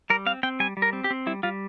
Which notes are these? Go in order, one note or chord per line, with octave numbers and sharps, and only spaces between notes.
G3 A#4
C4 F5
C4 G5
G3 G#5
G3
A#4
C4
G4
C4
G3 E4
G3 F4